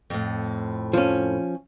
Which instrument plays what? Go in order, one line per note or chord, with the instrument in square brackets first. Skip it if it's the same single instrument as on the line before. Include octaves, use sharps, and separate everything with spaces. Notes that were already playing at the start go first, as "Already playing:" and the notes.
[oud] F2 A2
[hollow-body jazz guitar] F3 C#4